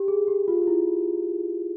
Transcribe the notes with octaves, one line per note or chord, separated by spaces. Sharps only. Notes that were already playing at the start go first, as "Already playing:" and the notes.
Already playing: G4
G#4
G4
F4
E4